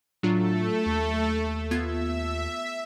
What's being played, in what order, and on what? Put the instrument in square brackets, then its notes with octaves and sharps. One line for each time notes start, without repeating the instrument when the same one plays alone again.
[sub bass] A2 [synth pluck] F#3 D4 F4 [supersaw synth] A3 A4
[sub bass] D#2
[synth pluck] B3 F4 G#6 [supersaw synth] E5